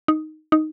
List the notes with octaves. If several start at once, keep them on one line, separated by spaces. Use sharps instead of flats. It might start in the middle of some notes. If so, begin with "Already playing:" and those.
D#4
D#4